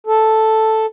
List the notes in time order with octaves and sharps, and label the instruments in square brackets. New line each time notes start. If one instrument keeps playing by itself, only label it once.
[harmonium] A4